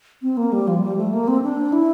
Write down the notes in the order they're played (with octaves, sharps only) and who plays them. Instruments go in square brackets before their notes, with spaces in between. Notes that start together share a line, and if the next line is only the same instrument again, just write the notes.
[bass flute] C4
A#3
G3
F3
G3
A3
A#3
C4
D4
E4